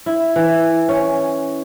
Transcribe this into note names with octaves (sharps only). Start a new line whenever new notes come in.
E4
E3
C#4